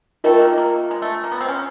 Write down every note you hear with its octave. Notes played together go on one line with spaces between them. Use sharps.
A3 F4 A#4 D#5 G5
A#3
A#3
G#3
A3
A#3
B3
C4
C#4